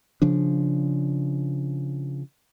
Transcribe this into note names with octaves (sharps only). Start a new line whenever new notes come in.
C#3 F3 D4